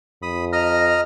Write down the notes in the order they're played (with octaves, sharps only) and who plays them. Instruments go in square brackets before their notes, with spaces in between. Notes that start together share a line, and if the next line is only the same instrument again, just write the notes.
[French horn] F2 [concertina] B5 D#6
[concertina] D#5 A#5 F6